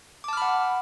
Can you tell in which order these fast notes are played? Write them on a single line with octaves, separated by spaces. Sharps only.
D6 A5 F6 B5 F#5